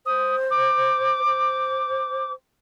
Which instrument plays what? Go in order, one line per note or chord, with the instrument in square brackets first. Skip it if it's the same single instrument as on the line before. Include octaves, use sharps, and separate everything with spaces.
[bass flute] C5 [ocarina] D#6
[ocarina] D6
[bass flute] C5